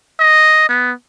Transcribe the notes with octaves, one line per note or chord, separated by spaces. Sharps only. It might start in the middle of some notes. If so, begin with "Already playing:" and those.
D#5
B3